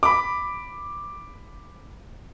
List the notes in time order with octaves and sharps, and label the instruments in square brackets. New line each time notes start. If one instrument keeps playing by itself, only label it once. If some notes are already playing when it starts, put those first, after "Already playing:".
[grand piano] B5 D6